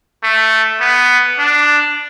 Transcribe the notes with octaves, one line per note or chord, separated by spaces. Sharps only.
A3
B3
D4